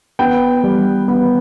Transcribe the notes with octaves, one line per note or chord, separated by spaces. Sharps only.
B3 G5
G3
B3